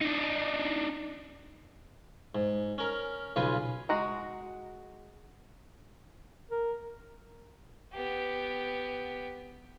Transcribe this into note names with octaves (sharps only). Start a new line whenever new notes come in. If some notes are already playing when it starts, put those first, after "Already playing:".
D4 D#4
G#2
C#4 A#4 A#5
B1 C#3 F4 B4 G#5
G#3 F#4 A#5
A#4
B3 G4